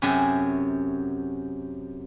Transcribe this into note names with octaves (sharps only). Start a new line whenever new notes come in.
F#2 C3 C#4 G#4 E5